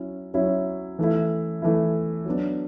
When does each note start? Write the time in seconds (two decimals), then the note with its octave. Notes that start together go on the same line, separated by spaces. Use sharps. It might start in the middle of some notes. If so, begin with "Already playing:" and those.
Already playing: F#3 C#4 E4
0.34 F#3 C#4 E4
0.99 E3 A3 E4
1.62 E3 A3 E4
2.25 F#3 B3 D4